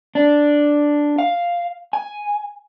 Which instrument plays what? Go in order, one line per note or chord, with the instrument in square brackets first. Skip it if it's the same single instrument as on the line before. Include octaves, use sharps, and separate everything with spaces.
[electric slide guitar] D4
F5
G#5